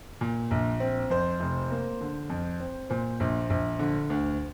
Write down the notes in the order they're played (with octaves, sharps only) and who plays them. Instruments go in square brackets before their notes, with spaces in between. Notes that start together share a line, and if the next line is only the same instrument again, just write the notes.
[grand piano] A#2
A#1
C4
F2 C5
F1
A#3
D3
F2
C4
A#2 C5
A#1
A#1
D3
D2